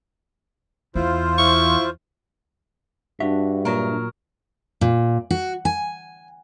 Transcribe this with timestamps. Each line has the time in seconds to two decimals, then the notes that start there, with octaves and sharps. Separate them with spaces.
0.95 E2 E4 F4 C5
1.38 E4 C#6
3.20 G2 D4 F#4 E5
3.65 A#2 F#3 A#4
4.81 A#2
5.31 F#4
5.65 G#5